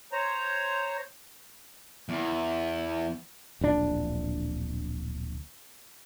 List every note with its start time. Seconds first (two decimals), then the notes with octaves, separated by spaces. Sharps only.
0.12 C5 C#5 A#5
2.09 E2
3.61 D1 A#1 D4